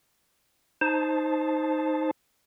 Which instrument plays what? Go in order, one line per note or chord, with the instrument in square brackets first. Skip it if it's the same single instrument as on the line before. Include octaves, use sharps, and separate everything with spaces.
[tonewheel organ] D#4 C5 A5